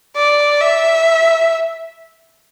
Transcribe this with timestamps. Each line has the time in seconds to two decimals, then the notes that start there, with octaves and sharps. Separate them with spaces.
0.16 D5
0.61 E5